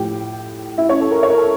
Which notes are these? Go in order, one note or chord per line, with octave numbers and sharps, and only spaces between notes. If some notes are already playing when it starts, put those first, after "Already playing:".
Already playing: A2 F3 G4 G5
E4 E5
C#4 C#5
A4
A#4
C#5
A#4
A4